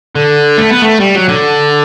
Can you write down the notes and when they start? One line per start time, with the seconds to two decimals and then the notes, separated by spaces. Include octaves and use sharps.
0.15 D3
0.58 A3
0.70 B3
0.82 A3
1.00 G3
1.15 F#3
1.28 D3